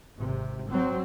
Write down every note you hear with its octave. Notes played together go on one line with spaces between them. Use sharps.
G#1 C3
F#3 C4